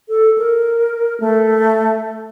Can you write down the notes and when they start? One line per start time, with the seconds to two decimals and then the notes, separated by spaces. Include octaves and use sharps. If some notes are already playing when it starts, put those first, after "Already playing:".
0.09 A4
0.38 A#4
1.20 A3